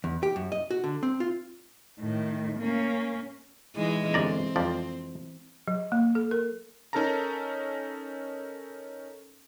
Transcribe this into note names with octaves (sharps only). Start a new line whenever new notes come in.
E2
G4
F#2
D#5
F#4
D3
C4
F4
A2 D#3
A#3 C#4
E3 G#3 D#4
G1 C4 D5 A#5
F2 F3 D5
F#3
A#3
A4
A#4
C#4 D#4 A4 A#4 A5 A#5